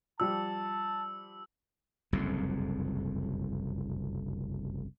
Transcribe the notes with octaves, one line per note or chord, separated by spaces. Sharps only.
F3 G3 G4 A5 E6
F#1 C2 F2 G#2